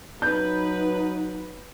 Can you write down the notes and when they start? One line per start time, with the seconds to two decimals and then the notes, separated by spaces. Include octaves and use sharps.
0.22 F#3 D#4 B4 G6